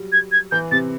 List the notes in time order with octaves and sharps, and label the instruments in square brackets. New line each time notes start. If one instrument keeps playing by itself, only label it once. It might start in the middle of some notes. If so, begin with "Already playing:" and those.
Already playing: [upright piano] F#3 G3
[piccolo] G#6
G#6
[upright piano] E3 [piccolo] G6
[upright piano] C3 [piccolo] A6